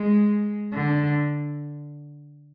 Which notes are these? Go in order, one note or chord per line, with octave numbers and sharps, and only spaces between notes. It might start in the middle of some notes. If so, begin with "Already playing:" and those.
Already playing: G#3
D3